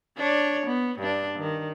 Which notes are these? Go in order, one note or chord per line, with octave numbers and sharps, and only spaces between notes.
D4 C#5
B3
G2 D4
D#3